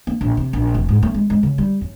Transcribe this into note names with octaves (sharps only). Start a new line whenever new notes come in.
A#3
A#1
C3
A#1
F1
G#2
A3
G#3
G#3
C#3
G3
F#2